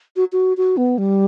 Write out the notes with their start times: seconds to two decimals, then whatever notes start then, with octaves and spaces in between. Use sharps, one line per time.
0.16 F#4
0.32 F#4
0.57 F#4
0.77 B3
0.98 G3